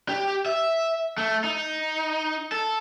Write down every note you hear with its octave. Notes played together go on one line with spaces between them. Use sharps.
G4
E5
A3
D#4
A4